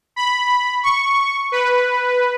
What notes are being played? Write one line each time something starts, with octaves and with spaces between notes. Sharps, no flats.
B5
C#6
B4